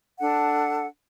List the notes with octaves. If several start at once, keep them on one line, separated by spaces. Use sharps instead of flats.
D4 A4 F#5